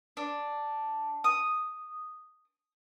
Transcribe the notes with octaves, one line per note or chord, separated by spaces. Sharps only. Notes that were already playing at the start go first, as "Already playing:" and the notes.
D4
D#6